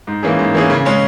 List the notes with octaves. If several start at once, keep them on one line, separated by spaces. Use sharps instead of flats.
G#2
E3 A#3 C#4 G#4
G#2
E3 A#3 C#4 G#4
C#3
G#3 C#4